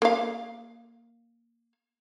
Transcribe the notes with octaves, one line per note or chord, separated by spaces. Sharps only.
A#3 F5